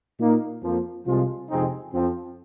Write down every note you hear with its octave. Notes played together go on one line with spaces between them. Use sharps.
A#2 A#3 D#4
F2 F3 A#3 F4
C2 C3 F3 G#3 F4
F2 C3 G#3 C4 D#4
F2 F3 C4 F4